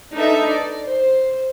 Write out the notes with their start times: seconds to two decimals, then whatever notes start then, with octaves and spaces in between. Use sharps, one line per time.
0.14 D4 D#4 A4 B4 E5
0.47 D5
0.85 C5